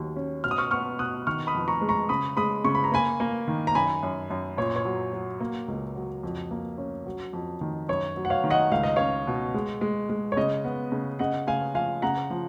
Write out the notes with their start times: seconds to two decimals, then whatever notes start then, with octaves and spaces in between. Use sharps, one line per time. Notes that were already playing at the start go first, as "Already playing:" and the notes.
Already playing: D#2 F#3
0.16 C#4
0.44 B2 F6
0.51 D#6
0.58 C#6 F6
0.71 B3 C#6 F6
0.99 B2 D#6 F#6
1.27 D#3 C#6 F6
1.47 B5 D#6
1.54 F2
1.68 A#5 C#6
1.81 G#3
1.89 A#5 C#6
2.09 C#3 B5 D#6
2.37 G#3 B5 D#6
2.64 C#3 C#6
2.75 B5
2.84 A#5
2.92 A#3 G#5 B5
3.20 A#3
3.48 D#3
3.67 A#5
3.75 F#2 G#5 B5
4.03 F#2
4.30 F#2
4.57 A#2 C#5
4.76 C#5
4.85 F#3
5.13 F#3
5.40 A#3
5.68 C#2
5.95 F#3
6.23 F2
6.51 A#3
6.78 C#4
7.06 F#3
7.33 F2
7.61 D#3
7.89 F#2 C#5
8.17 F#3
8.25 F#5
8.30 C#5 F5
8.44 D#3
8.50 D#5 F#5
8.71 C#2 F5
8.83 D#5
8.96 C#4 C#5 F5
9.27 B2
9.54 G#3
9.81 G#3
10.09 G#3
10.32 C#5
10.37 C#3 D#5
10.65 B3
10.92 C#3
11.19 C#3 D#5 F#5
11.47 C#3 F5 G#5
11.75 F3 F5 G#5
12.02 C#3 F#5 A#5
12.30 F3